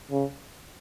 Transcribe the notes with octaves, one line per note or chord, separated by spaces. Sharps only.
C#3